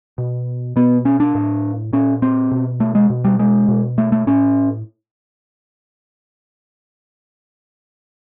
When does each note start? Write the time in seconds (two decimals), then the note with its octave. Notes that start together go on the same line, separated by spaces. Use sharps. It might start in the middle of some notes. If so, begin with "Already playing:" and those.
0.18 B2
0.76 B2 B3
1.05 C#4
1.20 D4
1.35 A2
1.93 A#2 C#4
2.22 C4
2.52 B2
2.80 A3
2.95 G#3
3.10 B2
3.24 G3
3.39 G#3
3.68 B2
3.98 A3
4.12 A3
4.27 A2 C#4